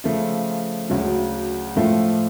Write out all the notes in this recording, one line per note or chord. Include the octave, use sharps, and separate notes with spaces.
C#3 F3 A3 F4
D2 C#3 F#3
A2 F3 A3 F4